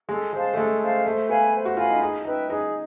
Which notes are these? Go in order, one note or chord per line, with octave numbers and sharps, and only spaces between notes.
G#3 A4
G#3 C5 F5 A5
A3
G#3 A4
C5 F5 A5
A3 C5
B3 F5 G#5 B5
C5
F#4
F4 F5 G#5 B5
D#4
D#4 G#4
D#4 B4 E5 G5
D#4 G#4